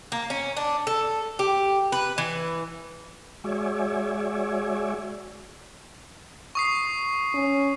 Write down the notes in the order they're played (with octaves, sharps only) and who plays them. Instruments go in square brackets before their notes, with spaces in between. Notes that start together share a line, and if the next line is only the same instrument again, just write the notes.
[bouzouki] A#3
C#4
D4
A4
G4
B4
E3
[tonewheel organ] G#3 F#4 C#5 D5 E5 G#5
[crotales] C#6 D#6 C7
[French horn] C#4